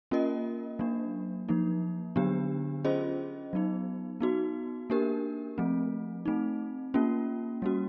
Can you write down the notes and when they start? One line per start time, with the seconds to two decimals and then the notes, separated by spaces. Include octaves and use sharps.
0.11 A#3 C#4 F4 A#4 D#5
0.79 F#3 A#3 D4
1.49 F3 A#3 D#4
2.16 D3 F#3 B3 D4 G4
2.84 C#4 F4 G#4 C5 D#5
3.53 F#3 B3 D#4
4.21 B3 D#4 F#4
4.90 A#3 D4 G4 A#4
5.58 F3 A3 C4
6.25 A3 C4 D#4
6.94 A#3 C#4 F4
7.62 G3 A#3 C#4 F#4